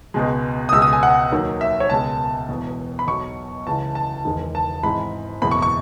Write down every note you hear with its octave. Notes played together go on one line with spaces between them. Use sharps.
C#2 B2 G#3
D#6
C#2 B2 G#3 E6
D#6
G#5
F#5
D#2 D#3 F#3
E5
C#5
C#2 B2 G#3 A5
E1 E2 B2
B5
B1 B2 F#3 C#6
C#2 C#3 E3 A5
A5
E1 E2 D#3 G#3
A5
G#1 G#2 E3 G#3 B5
F#1 E2 B2 G#3 B5
C#6
C#6